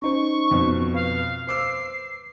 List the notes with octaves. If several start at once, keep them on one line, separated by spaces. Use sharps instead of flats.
C#4 D#4 C5 C#6
F2 B2
B4 F5
C5 D6 E6 C7